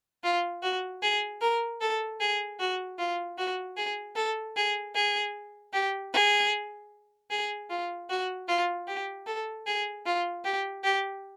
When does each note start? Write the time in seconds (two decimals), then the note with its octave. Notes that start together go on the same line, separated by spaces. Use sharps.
0.24 F4
0.63 F#4
1.03 G#4
1.41 A#4
1.81 A4
2.20 G#4
2.60 F#4
2.99 F4
3.38 F#4
3.77 G#4
4.16 A4
4.56 G#4
4.95 G#4
5.73 G4
6.13 G#4
7.30 G#4
7.70 F4
8.10 F#4
8.48 F4
8.87 G4
9.26 A4
9.66 G#4
10.06 F4
10.44 G4
10.84 G4